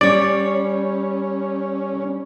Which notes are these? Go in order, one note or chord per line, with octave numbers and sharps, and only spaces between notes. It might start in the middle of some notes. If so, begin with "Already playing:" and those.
G3 C#4 C#5 D5